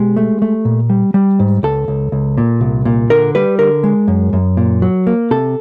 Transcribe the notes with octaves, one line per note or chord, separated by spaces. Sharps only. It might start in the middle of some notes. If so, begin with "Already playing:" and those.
Already playing: B2 G#3 G4
A3
A3
A#2
G3
G3
G#2
C#2 A4
C#2
C#2
A#2
C2
A#2
D3 A#4
G3 B4
D3 A#4
G#3
F#2
F#2
A#2
F#3
A#3
C3 A4